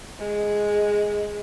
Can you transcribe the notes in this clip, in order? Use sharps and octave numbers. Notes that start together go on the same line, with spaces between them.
G#3